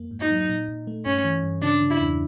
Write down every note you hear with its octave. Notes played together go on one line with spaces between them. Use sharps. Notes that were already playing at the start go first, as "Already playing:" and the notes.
Already playing: F2 A#3
G#2
D#4
F#3
A#2
A#2
A3
G2 C#4
E3
G2
C#3 D4
C#3
E4
E2